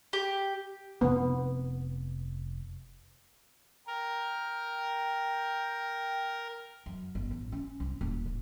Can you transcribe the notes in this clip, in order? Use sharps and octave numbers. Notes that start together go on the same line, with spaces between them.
G4
F1 B3
A#4 G5
F#2
G1
A1
C#4
C2
D#1
G#2